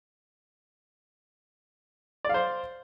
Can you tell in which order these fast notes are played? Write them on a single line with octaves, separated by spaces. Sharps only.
D5 F5 C5